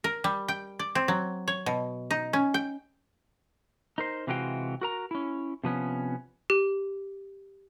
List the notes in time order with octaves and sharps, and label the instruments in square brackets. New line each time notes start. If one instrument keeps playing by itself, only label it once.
[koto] A#4
G3
G5
D5
C4
F#3
C#5
B2
D#4
C#4
G5
[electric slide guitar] D#4 A#4 C5
C3 E3 G#3 F4 F#4 G5
F#4 A#4 A#5
C#4 E4
C3 F3 B3 C#4
[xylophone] G4